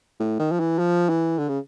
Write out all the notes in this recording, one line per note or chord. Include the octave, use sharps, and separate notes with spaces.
A2
D#3
F3
E3
F3
E3
D3
C#3